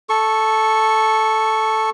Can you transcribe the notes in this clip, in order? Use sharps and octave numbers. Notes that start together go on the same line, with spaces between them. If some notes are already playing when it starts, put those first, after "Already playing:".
A4 C#6